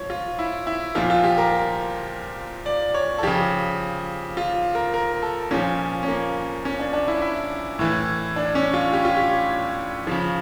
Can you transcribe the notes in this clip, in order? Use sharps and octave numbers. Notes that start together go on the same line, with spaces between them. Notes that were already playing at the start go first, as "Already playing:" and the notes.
Already playing: F3 C#5
F4
E4
E4
A#2 F3 F4
F4
G4
A#4
D5
C#5
A4
C#3 F3 G4
F4
A#4
A#4
A4
A#2 F3 C#4
C#4
A#3
C#4
D4
D4
E4
E4
A2 E3
D4
C#4
F4
G4
F4
G4
C#3 F3